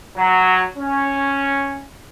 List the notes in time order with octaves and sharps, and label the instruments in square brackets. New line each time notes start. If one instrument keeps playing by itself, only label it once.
[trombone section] F#3
C#4